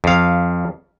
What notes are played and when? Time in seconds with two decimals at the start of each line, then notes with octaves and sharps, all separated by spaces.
0.04 F2 F5